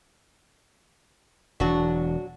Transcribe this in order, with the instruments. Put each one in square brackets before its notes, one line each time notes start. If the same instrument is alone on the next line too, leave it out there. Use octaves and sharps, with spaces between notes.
[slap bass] E1 E3 [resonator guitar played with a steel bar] F#3 D4 F#4